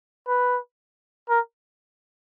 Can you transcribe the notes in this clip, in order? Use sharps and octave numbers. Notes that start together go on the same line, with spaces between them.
B4
A#4